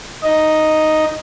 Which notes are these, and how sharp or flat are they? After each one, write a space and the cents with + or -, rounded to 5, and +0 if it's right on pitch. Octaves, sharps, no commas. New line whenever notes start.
D#4 +0 D#5 +0